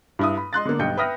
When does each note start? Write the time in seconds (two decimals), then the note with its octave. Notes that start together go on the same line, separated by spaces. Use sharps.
0.19 G2 E4 D#6
0.37 B5
0.53 D#5 C6 F#6 A6
0.65 D3 A#3
0.79 B1 G2 D#5 G5 G6 C#7
0.97 B4 E5 G5 D#6 F6 A#6